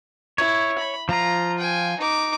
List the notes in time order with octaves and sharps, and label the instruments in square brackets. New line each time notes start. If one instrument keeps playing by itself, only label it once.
[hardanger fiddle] E4 [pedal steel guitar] C#5
[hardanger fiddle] B5
[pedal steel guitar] F3 F4 [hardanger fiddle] A#5
[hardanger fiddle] G5 G#5
D#4 D6